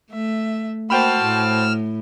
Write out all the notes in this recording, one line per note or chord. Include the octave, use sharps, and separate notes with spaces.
A3 E5
A#3 F#4 C5 G5 A5 B5 E6 F6
A2